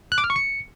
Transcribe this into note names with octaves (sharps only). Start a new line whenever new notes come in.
F#6
D6
F6
C#6
C#7